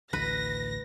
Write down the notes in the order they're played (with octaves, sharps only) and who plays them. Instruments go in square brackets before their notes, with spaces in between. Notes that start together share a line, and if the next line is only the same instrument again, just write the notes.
[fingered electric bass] A1 D2 A2 [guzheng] B4 [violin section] A#6